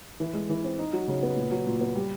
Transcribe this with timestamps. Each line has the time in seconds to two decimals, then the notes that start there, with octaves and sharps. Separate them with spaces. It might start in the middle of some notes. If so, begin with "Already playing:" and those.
0.20 E3
0.34 G#3
0.49 E3
0.64 C4
0.79 D#4
0.93 F#3
1.08 C#3
1.23 B3
1.37 A#2
1.51 F#3
1.67 A#2
1.81 B3
1.96 G3